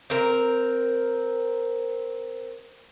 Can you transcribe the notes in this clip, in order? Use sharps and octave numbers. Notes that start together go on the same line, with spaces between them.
C4 A#4